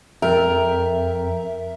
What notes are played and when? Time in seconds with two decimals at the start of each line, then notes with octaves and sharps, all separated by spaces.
0.22 F2 A#4 E5 G5